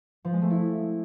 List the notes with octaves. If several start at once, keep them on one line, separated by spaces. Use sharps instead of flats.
F3
G#3
A3
E4